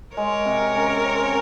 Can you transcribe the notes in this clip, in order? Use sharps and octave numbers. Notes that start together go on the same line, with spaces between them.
G#3 A#4 C#5
C3
C#4
C4